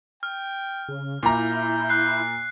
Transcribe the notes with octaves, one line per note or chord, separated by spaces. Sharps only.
G5 F6
C#3
A#2 E4 A#5 G6
F#6 C7